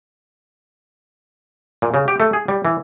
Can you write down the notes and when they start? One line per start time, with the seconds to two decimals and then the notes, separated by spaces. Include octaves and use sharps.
1.82 A#2
1.94 C#3
2.08 G4
2.20 A3
2.33 G#4
2.48 G3
2.65 E3